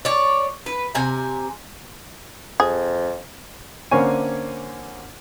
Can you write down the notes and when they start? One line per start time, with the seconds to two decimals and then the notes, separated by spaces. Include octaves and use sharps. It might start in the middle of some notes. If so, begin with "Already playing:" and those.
0.05 C#5 D5
0.66 B4
0.95 C3 G#5 A#5
2.60 F2 G#4
3.91 D3 A#3 C4 C#4 C#5 G#5